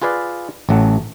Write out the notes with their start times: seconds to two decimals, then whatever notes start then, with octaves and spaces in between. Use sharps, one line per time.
0.02 F4 G#4 B4 D5 F5
0.69 A1 F#3 A3 F#5